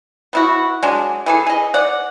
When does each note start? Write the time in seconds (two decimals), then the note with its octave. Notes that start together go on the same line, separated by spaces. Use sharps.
0.33 B3 E4 F#4
0.83 F#3 G#3 D4
1.26 E3 G#4 A4
1.47 G#4 D#5
1.74 D5 F#5